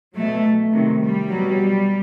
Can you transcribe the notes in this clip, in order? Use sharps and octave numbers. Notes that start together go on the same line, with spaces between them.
B2 F#3 A3
C3 D#3 F#3
G3
B2 F#3